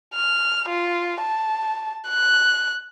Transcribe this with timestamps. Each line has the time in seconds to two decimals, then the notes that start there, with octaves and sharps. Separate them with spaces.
0.14 F6
0.69 F4
1.20 A5
2.08 F#6